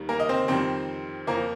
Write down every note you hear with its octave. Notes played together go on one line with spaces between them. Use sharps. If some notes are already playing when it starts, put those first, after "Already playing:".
Already playing: D#2 D#3 G3
A#3 A#4
D#5
C4 C5
F2 D#3 G3 C4 C5
F2 F3 A#3 A#4